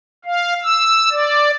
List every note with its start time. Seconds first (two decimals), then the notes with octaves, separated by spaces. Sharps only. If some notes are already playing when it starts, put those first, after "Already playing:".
0.25 F5
0.63 E6
1.11 D5